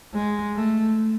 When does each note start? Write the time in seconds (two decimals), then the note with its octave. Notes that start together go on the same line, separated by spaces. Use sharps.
0.14 G#3
0.55 A3